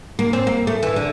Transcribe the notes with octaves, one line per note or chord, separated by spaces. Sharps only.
A#3
C4
A#3
A3
E3
D3